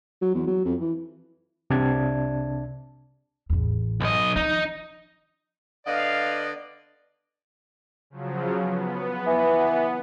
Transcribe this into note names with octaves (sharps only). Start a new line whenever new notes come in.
F#3
E2
F#3
F2
E3
C2 C3 D4 D5 A5 G#6
A1 E2
B1 D#5
D#3 F3 D#4
D3 B3 D5 D#5 F5
C#3 F3 F#3
B3
E3 B3